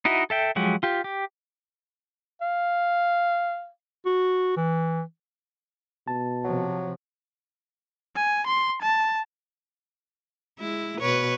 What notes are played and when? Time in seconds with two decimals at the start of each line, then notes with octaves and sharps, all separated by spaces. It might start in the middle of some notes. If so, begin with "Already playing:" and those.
0.05 D#4 E4 F#4 D#5
0.30 A4 E5 G5
0.56 F3 F#3 G#3 G4 F#5
0.83 F4 G4
1.04 G4
2.41 F5
4.06 F#4
4.57 E3
6.08 B2 A5
6.44 C3 F3 F#3
8.16 G#5
8.47 C6
8.82 A5
10.60 G#3 E4
11.01 B2 B4 C#5